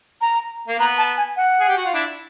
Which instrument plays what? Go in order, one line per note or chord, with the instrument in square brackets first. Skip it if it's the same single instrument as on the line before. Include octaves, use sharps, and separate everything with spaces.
[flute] A#5
[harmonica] A#3
[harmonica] B3 [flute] A#5
[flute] A5
G#5
F#5
[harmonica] G#4
G4
F#4
F4
D4 E4